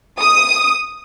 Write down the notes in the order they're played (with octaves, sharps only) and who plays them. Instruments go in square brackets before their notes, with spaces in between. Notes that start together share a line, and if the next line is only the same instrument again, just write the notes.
[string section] D#6